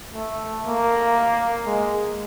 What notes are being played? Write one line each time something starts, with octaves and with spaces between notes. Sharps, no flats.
A3
A#3
G#3